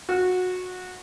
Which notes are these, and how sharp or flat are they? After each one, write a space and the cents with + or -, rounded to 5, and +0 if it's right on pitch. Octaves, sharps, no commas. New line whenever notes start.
F#4 -20